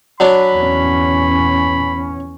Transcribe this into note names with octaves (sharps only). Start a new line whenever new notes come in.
F#3 D4 B5
E2 C#4